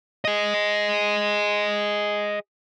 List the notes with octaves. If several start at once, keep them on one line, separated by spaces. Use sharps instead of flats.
G#4 D#5